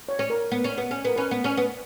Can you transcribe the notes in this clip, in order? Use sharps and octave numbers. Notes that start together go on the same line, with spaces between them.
C#5
C#4
A#4
B3
C#4
B3
C#4
B3 A#4
C#4 B4
B3
C#4
B3